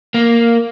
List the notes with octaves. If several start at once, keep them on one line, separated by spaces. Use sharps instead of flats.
A#3